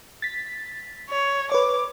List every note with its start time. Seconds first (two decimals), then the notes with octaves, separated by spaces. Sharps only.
0.22 A6 B6
1.09 C#5
1.52 B4 C#5 D6